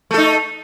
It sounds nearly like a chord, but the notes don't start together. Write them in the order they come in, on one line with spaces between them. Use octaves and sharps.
A3 A4 D#4